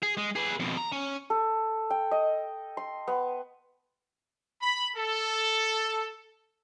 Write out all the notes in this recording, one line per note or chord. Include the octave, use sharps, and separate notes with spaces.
G#4
G#3
G#4 B4
F2 B2
A#5
C#4
A4
G5
D#5
C6
B3
B5
A4